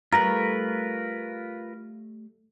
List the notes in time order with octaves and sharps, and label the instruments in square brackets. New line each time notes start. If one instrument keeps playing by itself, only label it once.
[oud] G3 A3 [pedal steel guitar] F4 A#4 B4 [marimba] A#5